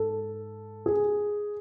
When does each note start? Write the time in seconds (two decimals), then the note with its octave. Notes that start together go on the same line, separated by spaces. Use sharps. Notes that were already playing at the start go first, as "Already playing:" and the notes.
Already playing: G#2 A4
0.86 G#4